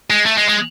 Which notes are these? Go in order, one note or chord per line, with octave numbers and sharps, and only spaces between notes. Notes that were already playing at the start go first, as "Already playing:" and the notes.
G#3
A3
G#3
G#3